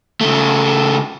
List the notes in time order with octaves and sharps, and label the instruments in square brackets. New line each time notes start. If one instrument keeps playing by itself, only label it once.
[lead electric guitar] C#3 A3